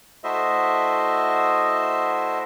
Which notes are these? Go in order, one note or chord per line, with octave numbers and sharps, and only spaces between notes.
A3 E4 F#4 C5 D#5 E5